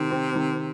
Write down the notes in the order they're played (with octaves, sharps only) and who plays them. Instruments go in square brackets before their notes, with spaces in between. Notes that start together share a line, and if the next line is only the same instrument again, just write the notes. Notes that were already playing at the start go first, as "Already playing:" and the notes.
Already playing: [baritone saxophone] C3 [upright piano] D#3
[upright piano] C4
D#3